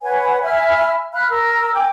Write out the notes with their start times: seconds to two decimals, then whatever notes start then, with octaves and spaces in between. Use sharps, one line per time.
0.02 B4 C#5 F#5 G#5
0.42 E5 G#5 B5 F6
1.13 F5 B5 F6 F#6
1.30 A#4 E6
1.75 G5 G#5 D6